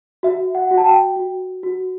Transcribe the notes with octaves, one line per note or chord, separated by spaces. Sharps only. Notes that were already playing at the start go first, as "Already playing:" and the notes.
F#4 E5
F#5
F#4
A5
G5
F#4
F#4